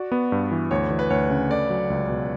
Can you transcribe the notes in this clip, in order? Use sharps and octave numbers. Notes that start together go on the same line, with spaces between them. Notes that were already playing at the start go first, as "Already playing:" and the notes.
Already playing: F#4 D5
B3
G2
E3
D2 C#5
E3
B4
D2 C#5
C#3
A3 D5
F#3
C#2
B2